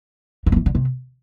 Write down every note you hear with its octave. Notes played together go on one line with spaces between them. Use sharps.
A#3
F3
E3
D3
C3